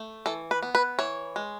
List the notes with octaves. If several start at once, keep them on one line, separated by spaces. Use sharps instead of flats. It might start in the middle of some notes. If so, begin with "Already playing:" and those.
Already playing: A3
E3 A4
B4
B3
B4
E3 C#5
G#3